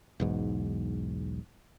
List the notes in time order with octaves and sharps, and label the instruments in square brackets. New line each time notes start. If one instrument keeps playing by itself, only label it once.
[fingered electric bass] B1 E2 G#2